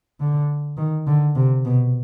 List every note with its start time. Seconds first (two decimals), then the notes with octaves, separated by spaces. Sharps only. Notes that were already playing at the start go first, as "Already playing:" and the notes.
0.20 D3
0.77 D#3
1.07 D3
1.35 C3
1.65 B2